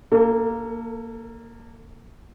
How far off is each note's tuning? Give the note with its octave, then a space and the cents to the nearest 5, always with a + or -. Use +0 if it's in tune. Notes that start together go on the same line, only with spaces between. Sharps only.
A#3 -5 A4 +25